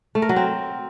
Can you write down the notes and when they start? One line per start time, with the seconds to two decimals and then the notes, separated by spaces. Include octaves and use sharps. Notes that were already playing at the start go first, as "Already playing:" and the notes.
0.15 A3
0.22 A#4
0.29 F#3
0.36 C4